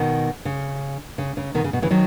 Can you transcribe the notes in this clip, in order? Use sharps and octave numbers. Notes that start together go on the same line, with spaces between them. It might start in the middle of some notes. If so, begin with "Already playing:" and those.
Already playing: B2 D#3
C#3
C#3
C#3
B2 D#3
C#3
B2
C#3 E3
D#3 F#3